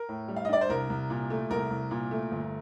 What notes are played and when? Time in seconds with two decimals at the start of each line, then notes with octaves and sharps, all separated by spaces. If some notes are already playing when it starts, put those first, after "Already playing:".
Already playing: A#4
0.09 A2
0.28 G3
0.36 F5
0.45 D#5
0.49 D4 D5
0.61 C5
0.69 C2 A#4
0.90 C2
1.10 A#2
1.30 A3
1.50 C2 A#4
1.70 C2
1.91 A#2
2.11 A3
2.31 G1